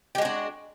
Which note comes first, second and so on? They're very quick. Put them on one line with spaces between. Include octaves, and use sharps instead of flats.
G4 G#3 F#4 D4